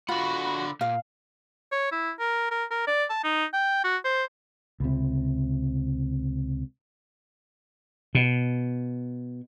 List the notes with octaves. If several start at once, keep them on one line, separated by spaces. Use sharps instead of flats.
D3 F4 F#4 F#5 B5
A#2 F5
C#5
E4
A#4
A#4
A#4
D5
A5
D#4
G5
F#4
C5
C#2 C3
B2